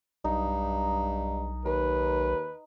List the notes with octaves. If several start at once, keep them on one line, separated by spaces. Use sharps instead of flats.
B1 G2 D#4
D#2 B4